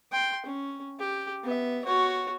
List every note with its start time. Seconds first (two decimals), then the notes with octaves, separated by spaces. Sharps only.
0.12 G5 C6
0.46 C#4
1.00 G4
1.44 B3 E5
1.85 F#4 C#5